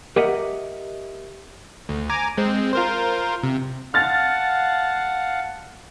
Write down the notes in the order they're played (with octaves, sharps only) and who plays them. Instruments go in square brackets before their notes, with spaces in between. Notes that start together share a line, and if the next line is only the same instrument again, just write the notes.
[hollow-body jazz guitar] G4 A#4 D#5 E5 F#5
[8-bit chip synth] D2
G#5 A#5 D6
G#3 C4
F4 A#4 C5
C3
[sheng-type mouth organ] F5 F#5 A5 [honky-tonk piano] F6 A6